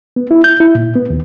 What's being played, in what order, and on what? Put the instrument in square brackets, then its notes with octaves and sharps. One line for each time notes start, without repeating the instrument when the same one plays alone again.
[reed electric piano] B3
E4
G6
E4
A#2
B3
D#2